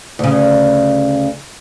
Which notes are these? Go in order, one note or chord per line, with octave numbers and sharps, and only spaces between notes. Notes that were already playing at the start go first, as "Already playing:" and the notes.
D2 C#3